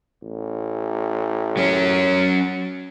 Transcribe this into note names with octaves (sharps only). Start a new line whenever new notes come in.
A1
F#3 C#4